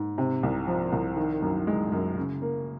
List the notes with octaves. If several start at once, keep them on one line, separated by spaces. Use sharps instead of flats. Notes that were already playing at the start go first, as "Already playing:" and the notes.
Already playing: G#2
C3
C2
F3
C2
D#3
F#2
G#3
F#2
C#3
A#3